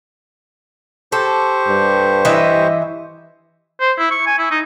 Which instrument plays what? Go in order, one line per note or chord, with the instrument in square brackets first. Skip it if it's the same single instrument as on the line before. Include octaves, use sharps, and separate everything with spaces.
[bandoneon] G4 C5 C#6 [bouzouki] A4
[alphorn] G2
[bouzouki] E3 D#5 E5
[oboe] C5
E4
C#6
G#5
E4
D#4